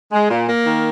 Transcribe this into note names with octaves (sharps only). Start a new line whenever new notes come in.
G#3
A#2
A#3
D#3